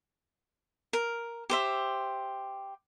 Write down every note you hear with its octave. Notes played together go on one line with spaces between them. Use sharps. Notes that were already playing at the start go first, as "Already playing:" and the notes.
A#4
G4 C5 E5